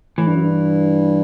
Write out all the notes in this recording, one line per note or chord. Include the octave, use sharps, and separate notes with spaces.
A2 E3
G2
F#2
G2